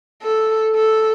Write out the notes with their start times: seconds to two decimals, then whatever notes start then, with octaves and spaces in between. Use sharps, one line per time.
0.22 A4
0.75 A4